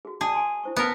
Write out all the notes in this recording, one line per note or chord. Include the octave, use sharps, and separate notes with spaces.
F#4 G#4
G#4 D5 G5 A5
G#5 C6
E4 C5 C#6
B3 C#4 A#4 A5